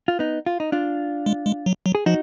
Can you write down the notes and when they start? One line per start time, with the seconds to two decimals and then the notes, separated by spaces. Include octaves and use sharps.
0.08 F4
0.19 B3 D#4
0.46 F4
0.60 D#4
0.72 D4 F4
1.26 G#3
1.46 G#3
1.66 F#3
1.86 F#3
1.95 G#4
2.06 F3 D#4 F#4